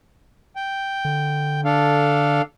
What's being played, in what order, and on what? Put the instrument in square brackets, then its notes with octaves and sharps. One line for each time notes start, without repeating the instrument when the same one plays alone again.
[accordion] G5
[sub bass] D3
[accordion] D4 A4 F5